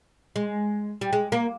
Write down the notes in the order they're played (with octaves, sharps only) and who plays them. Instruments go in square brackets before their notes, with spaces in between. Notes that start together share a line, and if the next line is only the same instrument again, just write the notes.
[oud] G#3
G3
G#3
A#3